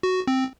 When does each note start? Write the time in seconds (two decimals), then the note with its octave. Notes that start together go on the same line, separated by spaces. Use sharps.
0.03 F#4
0.27 C4